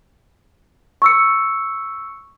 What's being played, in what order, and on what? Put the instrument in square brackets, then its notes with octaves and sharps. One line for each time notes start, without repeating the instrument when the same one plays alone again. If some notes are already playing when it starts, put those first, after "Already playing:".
[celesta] C#6 E6 C#7